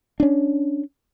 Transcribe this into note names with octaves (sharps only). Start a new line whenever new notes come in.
C#4 D4